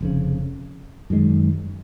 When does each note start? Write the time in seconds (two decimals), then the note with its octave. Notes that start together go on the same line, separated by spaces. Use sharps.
0.01 F1 F2 C#3
1.10 F#2 D#3 G#3